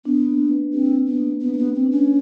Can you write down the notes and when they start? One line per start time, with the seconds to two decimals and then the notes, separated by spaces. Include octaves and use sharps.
0.05 B3 D4
0.28 A#3
0.51 B4
0.73 C4 G4
0.96 D4
1.07 B3
1.18 A#3
1.41 B3 B4
1.53 A#3
1.58 B3
1.64 G4
1.75 C4
1.86 D4
1.91 C#4